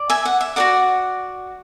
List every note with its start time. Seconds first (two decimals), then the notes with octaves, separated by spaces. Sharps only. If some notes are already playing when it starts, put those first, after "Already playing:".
Already playing: D5
0.10 E5 G#5
0.25 F#5
0.41 E5
0.56 F#4 A4 D5 F#5